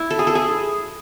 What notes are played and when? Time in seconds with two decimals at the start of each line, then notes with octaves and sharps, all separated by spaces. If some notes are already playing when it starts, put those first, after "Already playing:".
Already playing: E4
0.10 A4
0.19 G#4
0.27 A4
0.35 G#4